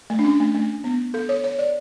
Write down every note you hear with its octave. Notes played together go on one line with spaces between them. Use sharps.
A3
D4
C#4
A3
A3
B3
A4
C#5
C#5
D5